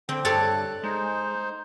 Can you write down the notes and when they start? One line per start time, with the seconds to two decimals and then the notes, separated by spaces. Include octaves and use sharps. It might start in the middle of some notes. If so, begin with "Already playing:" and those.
0.09 D3 C4 G5
0.25 G2 C3 A4 C#5 D5 F#6
0.83 G#3 D#4 C5